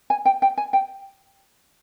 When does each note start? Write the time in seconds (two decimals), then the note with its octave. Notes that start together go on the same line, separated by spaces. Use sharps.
0.10 G#5
0.26 G5
0.42 G5
0.58 G#5
0.73 G5